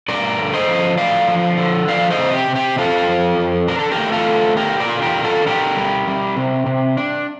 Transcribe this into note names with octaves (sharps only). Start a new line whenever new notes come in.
G2 A#4 D5
D3
C5 D#5
F3
D3 D5 F5
F3
D3
F3 D5 F5
C5 D#5
C3
G4
C3
G4
C4 F4 A4
F2
F2
D4 A#4
A4
G4 A#4
A3
F4 A4
D3
D3 G4 A#4
A#4 D5
F4
G4 A#4
D3
F4 A4
D4 G4 A#4
G3
G3
C3
C3
D4